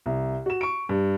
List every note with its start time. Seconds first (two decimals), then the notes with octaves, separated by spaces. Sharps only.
0.06 C2
0.46 F#4 E7
0.61 C#6 D7
0.89 G2